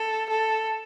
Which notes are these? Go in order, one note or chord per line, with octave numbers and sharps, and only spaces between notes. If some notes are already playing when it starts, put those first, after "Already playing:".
Already playing: A4
A4